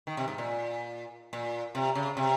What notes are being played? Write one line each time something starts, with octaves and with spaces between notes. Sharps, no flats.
D#3
C3
G#2
A#2
A#2
C3
C#3
C3